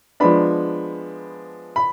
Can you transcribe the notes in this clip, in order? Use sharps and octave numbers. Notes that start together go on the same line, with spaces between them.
F3 G#3 B3 D4 B5
B5